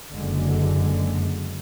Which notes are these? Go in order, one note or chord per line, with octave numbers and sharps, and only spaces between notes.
F#1 F#2 D3 G#3